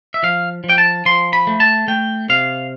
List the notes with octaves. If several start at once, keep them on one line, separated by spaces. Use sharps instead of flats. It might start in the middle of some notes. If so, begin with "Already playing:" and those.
E5
F3 F5
F3
G5
A5
F3 C6
B5
A3
A5
A3 G5
C3 F5